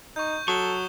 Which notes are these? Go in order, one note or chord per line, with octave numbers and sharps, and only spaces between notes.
D#4 C#6 G6
F#3 A4 C#6 D#6 E7 G7